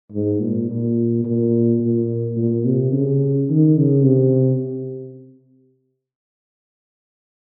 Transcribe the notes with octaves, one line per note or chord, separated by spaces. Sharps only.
G#2
A#2
A#2
A#2
A#2
A#2
C3
C#3
D#3
C#3
C3